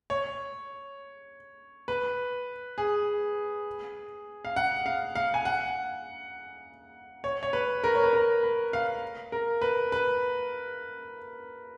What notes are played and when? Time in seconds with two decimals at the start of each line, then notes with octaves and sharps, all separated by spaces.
0.10 C#5
1.88 B4
2.78 G#4
4.45 F5
4.56 F#5
4.86 F5
5.15 F5
5.34 G#5
5.45 F#5
7.24 C#5
7.43 C#5
7.53 B4
7.84 A#4
7.95 C#5
8.04 B4
8.13 A#4
8.43 B4
8.73 F5
9.32 A#4
9.62 B4
9.92 B4